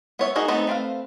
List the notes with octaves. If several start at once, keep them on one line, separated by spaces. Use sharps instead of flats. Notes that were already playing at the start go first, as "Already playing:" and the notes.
B3 C#5 E5
D#4 F#4 G#4 A#4
A3 B3 C4 D#4
A3 C4 B4 F5